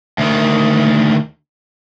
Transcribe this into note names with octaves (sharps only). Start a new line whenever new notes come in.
D2 D#3